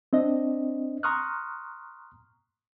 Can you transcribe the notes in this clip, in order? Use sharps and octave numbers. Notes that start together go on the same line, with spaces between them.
C4 D4 D#5
A#5 C6 C#6 D#6 F6 F#6